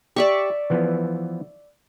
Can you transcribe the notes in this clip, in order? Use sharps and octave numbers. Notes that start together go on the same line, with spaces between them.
G4 D5 E5 C#6
E3 F3 B3